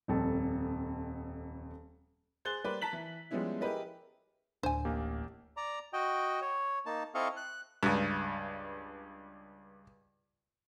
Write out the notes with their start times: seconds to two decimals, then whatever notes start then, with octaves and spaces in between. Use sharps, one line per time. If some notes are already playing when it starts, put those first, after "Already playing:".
0.08 D#1 F2 A4
2.45 G#4 C5 F#6 A6 G7
2.64 G3 A#3 B4 C5 D5
2.81 A5 A#5 B6 F#7
2.93 E3
3.31 F3 G3 G#3 B3 C#4 E4
3.61 E4 G4 G#4 A#4 B4 D#5
4.63 D1 D4 C5 G#5
4.85 A1 A#3 G4
5.57 D5 A#5
5.93 F#4 D#5 G5
6.42 C#5
6.86 A#3 D#4 A5
7.15 C4 E4 A4 D#5 F5 C#6
7.37 F#6
7.83 C#2 G2